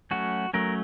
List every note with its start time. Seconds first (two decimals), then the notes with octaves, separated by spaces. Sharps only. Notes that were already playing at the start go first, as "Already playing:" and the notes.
0.11 F#3 A3 C#4 F#4
0.54 F#3 A3 C#4 A#4